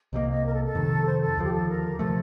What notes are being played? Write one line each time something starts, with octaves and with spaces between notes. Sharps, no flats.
C2 C3 F3 A#3 D#5
D#5
A#4
A4
A4
F2 C3 D#3
C5
A4
D#2 D3 F3 G4
A4
A#4
G4
C3 F3 A3 A4